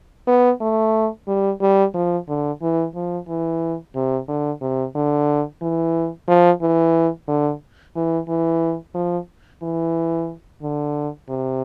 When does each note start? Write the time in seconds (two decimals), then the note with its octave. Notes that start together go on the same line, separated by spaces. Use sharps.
0.27 B3
0.61 A3
1.28 G3
1.61 G3
1.94 F3
2.28 D3
2.62 E3
2.95 F3
3.28 E3
3.95 C3
4.28 D3
4.61 C3
4.95 D3
5.62 E3
6.28 F3
6.62 E3
7.28 D3
7.96 E3
8.28 E3
8.94 F3
9.62 E3
10.62 D3
11.29 C3